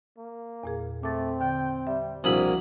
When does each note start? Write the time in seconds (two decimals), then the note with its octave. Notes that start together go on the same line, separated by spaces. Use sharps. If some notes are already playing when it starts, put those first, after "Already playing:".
0.18 A#3
0.63 E2 A#2 G#4
1.03 A3 C4 D6 A6
1.41 D3 G5
1.87 G3 E5
2.24 C2 F3 A#3 D4 E4 F#4 G#4 B5